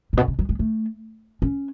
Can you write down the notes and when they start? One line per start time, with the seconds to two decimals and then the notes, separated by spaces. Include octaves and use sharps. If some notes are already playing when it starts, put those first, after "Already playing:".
0.13 A2
0.17 B2
0.28 C#3
0.39 F#3
0.49 G#3
0.59 A3
1.42 C#4